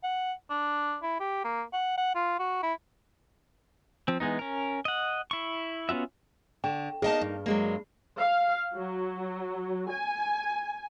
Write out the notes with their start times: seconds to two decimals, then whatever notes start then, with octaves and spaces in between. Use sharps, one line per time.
0.04 F#5
0.50 D4
1.03 E4
1.20 G4
1.45 A#3
1.73 F#5
1.98 F#5
2.15 F4
2.39 F#4
2.63 E4
4.08 F3 C4
4.20 E3 G#3 B3 D#4
4.39 C#4 A#4
4.85 D#5 F#5
5.31 E4 C#6
5.89 B3 C#4 F4 F#4 E5
6.64 D3 G5
7.02 A#3 B3 D#4 G#4 D#5 A5
7.21 G2
7.46 F#3 G#3 A#3
8.19 F5
8.74 F#3
9.89 G#5